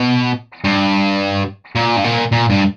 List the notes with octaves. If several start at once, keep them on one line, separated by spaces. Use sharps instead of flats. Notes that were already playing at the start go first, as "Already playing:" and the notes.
Already playing: B2
G2
A#2
G2
A#2
A#2
G2